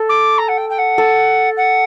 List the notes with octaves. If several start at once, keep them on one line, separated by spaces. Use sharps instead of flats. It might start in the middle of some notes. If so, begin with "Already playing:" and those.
Already playing: A4
D6
A#5
F#5
G5
G5
F#5
A4
F#5